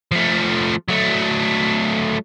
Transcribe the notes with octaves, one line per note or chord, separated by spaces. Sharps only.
F3 A3
F#3 A3